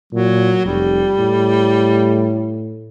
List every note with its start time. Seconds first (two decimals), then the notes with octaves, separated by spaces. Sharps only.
0.13 A#2 F#3
0.65 F1 G3
1.18 A2